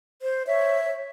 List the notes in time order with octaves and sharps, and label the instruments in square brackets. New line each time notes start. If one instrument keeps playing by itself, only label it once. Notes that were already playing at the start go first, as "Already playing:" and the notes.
[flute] C5
[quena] C#5 [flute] E5